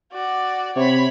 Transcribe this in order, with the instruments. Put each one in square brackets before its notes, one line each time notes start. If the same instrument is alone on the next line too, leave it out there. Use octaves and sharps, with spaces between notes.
[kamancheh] F#4 D5
[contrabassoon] C3 [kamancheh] C#5 B5